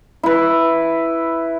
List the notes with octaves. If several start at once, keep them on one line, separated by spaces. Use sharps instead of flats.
E4 B4